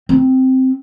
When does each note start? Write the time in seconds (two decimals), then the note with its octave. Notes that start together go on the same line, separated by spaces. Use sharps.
0.09 C4